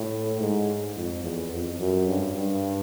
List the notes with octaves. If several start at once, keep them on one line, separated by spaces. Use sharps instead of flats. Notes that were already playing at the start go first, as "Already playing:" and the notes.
Already playing: A2
G#2
F2
E2
F2
F#2
G2
G2